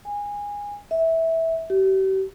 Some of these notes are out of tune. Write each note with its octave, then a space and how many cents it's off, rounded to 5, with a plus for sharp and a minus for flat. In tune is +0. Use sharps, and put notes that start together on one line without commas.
G#5 -20
E5 -15
G4 -40